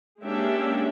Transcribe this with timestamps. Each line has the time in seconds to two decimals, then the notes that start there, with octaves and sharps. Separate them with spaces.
0.21 G#3 A#3 C#4 D4 G4 E5